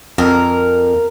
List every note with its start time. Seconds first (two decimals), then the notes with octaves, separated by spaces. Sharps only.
0.18 F2 A#4